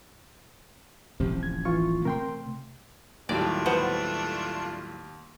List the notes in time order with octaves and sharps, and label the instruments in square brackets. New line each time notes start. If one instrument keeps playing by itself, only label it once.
[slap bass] D#1 A1 F3 [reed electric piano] C3
[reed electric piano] G#6
E3 F4 C#6
[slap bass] C3 A3 C4 [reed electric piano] A#4 G5 C6
[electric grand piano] D#2 [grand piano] A2 F#3 G3 [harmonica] A3 D4 F4 [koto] D5
[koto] B3 C5 F#5